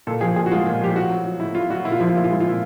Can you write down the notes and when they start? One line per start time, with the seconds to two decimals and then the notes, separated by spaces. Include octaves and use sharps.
0.07 A#2 A4
0.21 F3 G#4
0.36 A#2 G#4
0.46 F#4
0.52 G#3 F4
0.66 A#2
0.81 F3 G4
0.96 A2 F#4
1.10 F#3
1.25 F#3
1.40 A2 E4
1.55 A2 F4
1.70 F#3 F#4
1.85 A#2 E4
1.92 F4
2.00 F3 E4
2.09 F4
2.14 A#2 E4
2.24 F4
2.29 G#3 E4
2.40 F4
2.44 A#2 E4